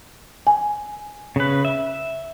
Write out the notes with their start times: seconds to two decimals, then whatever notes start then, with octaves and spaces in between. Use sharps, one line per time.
0.47 G#5
1.36 C#3 B4
1.65 E5